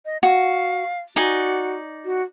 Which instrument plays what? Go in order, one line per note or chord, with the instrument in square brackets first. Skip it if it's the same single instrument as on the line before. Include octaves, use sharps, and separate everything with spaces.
[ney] D#5
[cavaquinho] F#4 [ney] F5
[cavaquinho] D#4 D5 G#5 [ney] F#4
[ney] F#4